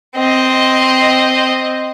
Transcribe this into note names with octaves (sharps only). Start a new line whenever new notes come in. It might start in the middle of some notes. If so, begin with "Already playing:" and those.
C4 D#5